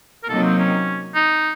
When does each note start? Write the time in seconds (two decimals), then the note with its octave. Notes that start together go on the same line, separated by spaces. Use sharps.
0.23 A#4
0.29 C3 F#3 A#3 D#4 A4
0.44 C4
0.58 C#4
1.15 D#4